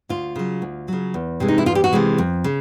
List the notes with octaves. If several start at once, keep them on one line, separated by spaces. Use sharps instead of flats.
D2 F4
C#3 F#3
D2
C#3 F#3
E2
C3 E3 G#3
D#4
E4
E2 F4
G4
F#4
C3 E3 G#3
F2
C#3